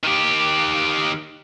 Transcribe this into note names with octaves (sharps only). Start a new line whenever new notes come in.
D#3 G4